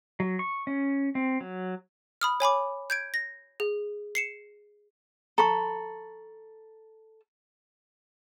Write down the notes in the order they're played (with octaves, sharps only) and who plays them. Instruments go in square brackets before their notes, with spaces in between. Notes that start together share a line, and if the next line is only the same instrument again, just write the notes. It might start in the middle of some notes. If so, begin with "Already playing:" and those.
[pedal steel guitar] F#3
C#6
C#4
C4
F#3
[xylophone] B5 D#6 F6
C#5 G#5 B5 D6
G6 G#6 D7
A#6
G#4
C7 C#7 E7
[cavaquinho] A4 B5 [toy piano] A#5 C#6